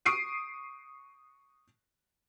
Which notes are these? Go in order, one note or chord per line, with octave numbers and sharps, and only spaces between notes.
C#6 D#6 C7 D7 D#7